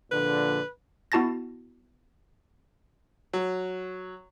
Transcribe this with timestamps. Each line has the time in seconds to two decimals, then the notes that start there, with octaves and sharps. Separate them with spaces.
0.11 A#1 A#2 D3 B4
1.12 B3 E4 F#4 A5 A6 A#6
3.33 F#3